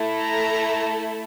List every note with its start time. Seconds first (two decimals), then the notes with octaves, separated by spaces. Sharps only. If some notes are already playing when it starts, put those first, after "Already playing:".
Already playing: A3 E4 A4
0.21 A#5